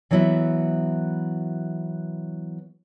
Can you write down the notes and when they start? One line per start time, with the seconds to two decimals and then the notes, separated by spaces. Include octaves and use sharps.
0.11 E3 F#3 B3 E4 F#4 E5